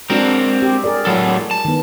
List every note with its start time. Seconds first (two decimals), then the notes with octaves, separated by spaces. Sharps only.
0.10 G#3 C4 D4 F#4 A#4
0.62 G4
0.84 G#4 A#4 D5
1.05 A2 F#3 A4
1.51 A5
1.65 D#3 B3